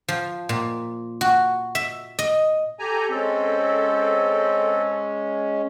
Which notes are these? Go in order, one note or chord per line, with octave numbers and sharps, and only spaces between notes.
F3
A#2
F#4
E5
D#5
G4 A4 G#5 A#5
G#3 C4 C#4 A4